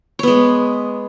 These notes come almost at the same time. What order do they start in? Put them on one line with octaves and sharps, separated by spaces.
C#5 B3 G#3